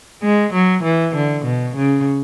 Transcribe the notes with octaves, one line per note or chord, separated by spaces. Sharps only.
G#3
F#3
E3
D3
B2
C#3